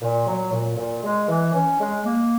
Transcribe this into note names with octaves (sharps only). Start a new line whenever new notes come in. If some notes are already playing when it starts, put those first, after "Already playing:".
A#2
F#3
A#2
A#2
G#3
E3
C#4
G#3
A#3